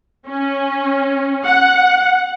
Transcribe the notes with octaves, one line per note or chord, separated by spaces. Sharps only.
C#4
F#5